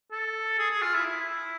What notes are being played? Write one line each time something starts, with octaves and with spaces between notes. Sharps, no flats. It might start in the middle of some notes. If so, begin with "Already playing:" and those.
A4
G#4
G#4
F4
E4
E4